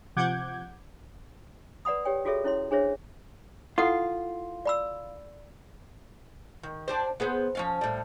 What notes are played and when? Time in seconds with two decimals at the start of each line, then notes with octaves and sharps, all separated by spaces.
0.16 C3 F3 F#5 D6 G6 G#6
1.85 B4 D5 F#5 B5 D#6
2.05 G4 C#5 G5
2.25 F4 F#4 G#4 A4 C#5 E5
2.44 C#4 E4 C#5 C6
2.71 D4 G#4 C5 C#5 E5
3.78 E4 F4 A4 F#5
4.65 D5 B5 E6
6.63 D#3
6.88 D4 G4 C5
7.20 B3 G#4 C5
7.55 F3 C#4 F5
7.81 A2 G3